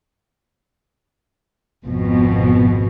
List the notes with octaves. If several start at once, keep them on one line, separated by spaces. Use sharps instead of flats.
G#1 F2 B2